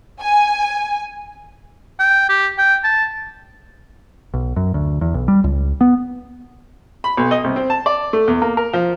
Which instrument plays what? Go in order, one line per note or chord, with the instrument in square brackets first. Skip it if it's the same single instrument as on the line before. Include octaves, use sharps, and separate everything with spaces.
[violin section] G#5
[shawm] G5
G4
G5
A5
[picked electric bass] B1
F#2
D2
E2
B1
G3
C#2
B3
[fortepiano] B5
B1
D#5
C2
C4
A5
D5
A3
E2
A#3
A#4
F3